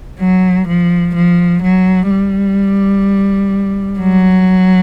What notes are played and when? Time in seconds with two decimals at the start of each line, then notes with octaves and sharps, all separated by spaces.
0.20 F#3
0.68 F3
1.15 F3
1.62 F#3
2.10 G3
4.00 F#3